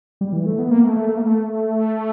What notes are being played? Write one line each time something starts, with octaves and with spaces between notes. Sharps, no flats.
G3
E3
A3
B3
A#3
A3
A3
A3
A#3
A3